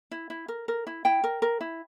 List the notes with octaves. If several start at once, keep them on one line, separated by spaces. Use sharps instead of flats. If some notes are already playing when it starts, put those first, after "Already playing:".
E4
E4
A#4
A#4
E4
E4 G5
A#4
A#4
E4